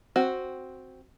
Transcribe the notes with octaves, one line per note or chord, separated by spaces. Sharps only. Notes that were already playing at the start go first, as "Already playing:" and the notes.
C4 F#4